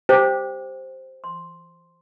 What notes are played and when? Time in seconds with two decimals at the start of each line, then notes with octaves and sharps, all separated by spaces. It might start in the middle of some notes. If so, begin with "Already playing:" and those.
0.09 G4 C5
1.24 C6